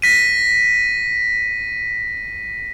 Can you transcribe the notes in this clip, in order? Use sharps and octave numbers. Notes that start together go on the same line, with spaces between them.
A#6 B6 D#7